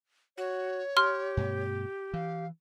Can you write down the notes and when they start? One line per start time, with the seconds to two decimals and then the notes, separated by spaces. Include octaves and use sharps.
0.38 F#4 C#5
0.97 G4 C6 F6
1.37 G2 B2 A3
2.14 E3 F5